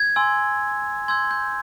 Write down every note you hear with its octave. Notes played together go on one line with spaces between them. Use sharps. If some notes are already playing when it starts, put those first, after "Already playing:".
Already playing: G#6
G#5 C6 E6
C6 E6 G6 G#6
G6